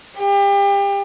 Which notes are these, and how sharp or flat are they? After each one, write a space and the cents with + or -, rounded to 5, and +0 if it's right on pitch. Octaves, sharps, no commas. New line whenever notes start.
G4 +30